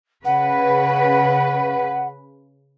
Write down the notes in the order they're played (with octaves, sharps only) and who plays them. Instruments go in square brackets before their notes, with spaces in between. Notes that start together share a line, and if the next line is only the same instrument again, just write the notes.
[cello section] C#3 B4 [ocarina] F#5